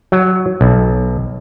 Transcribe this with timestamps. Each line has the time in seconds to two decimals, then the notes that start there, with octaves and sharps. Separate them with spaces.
0.12 F#3
0.61 B1